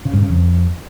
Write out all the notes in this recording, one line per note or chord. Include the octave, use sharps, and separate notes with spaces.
C#3
G2
C#3
F2